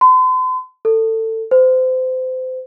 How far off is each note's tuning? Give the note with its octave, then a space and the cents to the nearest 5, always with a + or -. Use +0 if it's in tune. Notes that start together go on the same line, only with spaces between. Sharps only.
C6 -45
A4 +20
C5 -30